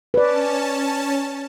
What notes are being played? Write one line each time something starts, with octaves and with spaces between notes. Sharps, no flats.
C#4 B4 D5 A5